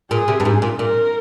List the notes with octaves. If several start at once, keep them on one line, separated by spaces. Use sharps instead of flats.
A#2 G#4
C3
G2
G#2
A#2
A#2 A#4